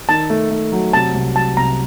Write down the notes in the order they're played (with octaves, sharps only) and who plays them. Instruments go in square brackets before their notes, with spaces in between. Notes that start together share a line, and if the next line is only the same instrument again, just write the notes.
[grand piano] D#3 [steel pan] A5
[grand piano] A3
A3
F#3
[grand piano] C3 [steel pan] A5
[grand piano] C2
[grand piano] F#3 [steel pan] A5
[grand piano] C2 [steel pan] A#5